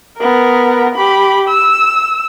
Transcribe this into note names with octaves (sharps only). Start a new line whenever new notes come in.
B3 A#4
G4 B5
E6